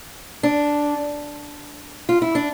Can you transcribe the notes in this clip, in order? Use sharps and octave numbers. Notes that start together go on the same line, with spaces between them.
D4
F4
E4
D4